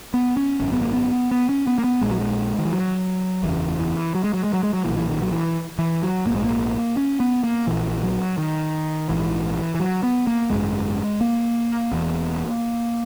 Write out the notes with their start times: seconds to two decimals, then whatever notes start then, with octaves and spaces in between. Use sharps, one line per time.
0.14 B3
0.37 C#4
0.60 G#1 F#2 C#3 C#4
0.72 B3
0.82 A#3
0.93 B3
1.31 B3
1.49 C#4
1.67 B3
1.78 A#3
1.84 B3
2.01 A#1 A#2 G#3
2.11 F#3
2.20 G#3
2.59 D#3
2.65 E3
2.72 F#3
3.43 F#1 E2 C#3 E3
3.79 E3
4.15 F#3
4.24 G#3
4.34 F#3
4.44 G#3
4.53 F#3
4.63 G#3
4.73 F#3
4.84 B1 A#2 E3
4.97 E3
5.09 D#3
5.22 F#3
5.31 E3
5.79 E3
6.03 F#3
6.26 G#2 A#3
6.30 A#1
6.36 G#3
6.44 A#3
6.97 C#4
7.20 B3
7.44 A#3
7.67 A#1 A#2 E3
8.03 F#3
8.38 D#3
9.09 A#1 G#2 E3
9.75 E3
9.80 F#3
10.03 B3
10.27 A#3
10.50 G#1 F#2 C#3 G#3
11.21 A#3
11.92 E1 E2 B2